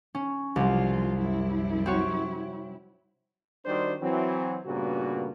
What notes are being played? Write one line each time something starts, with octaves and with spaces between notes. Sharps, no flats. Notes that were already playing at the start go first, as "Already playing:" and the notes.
C#4
C2 F2 F#3 G3 F4
F#2 E4
C4 F#4 C#5
D#3 G3 D4 F#4 C5
E3 F#3 C4
G2 A#2 C#3 A#3 B3 F#4